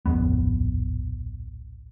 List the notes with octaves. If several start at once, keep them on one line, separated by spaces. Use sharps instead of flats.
D1 A#1 F2 B3